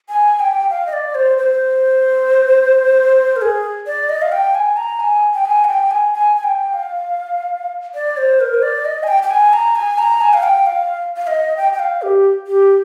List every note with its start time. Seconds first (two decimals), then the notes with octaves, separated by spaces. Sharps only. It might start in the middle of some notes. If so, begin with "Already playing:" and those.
0.09 G#5
0.40 G5
0.70 F5
0.86 D#5
0.93 D5
1.15 C5
1.38 C5
3.36 A#4
3.42 G#4
3.87 D5
4.09 D#5
4.22 F5
4.32 G5
4.55 G#5
4.77 A#5
5.00 G#5
5.34 G5
5.45 G#5
5.65 F5
5.68 G5
5.91 G#5
6.14 G#5
6.36 G#5
6.44 G5
6.74 F5
7.95 D5
8.17 C5
8.40 A#4
8.54 C5
8.62 D5
8.85 D#5
9.03 G#5
9.08 G5
9.23 G5
9.30 G#5
9.53 A#5
9.76 G#5
9.98 A#5
10.21 G#5
10.33 F5
10.43 G5
10.66 F5
11.17 F5
11.27 D#5
11.57 G5
11.73 G5
11.79 F5
12.02 G4
12.47 G4